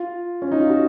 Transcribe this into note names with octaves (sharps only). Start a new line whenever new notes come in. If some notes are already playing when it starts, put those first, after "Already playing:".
Already playing: F4
C#4
D#4
F4
F#4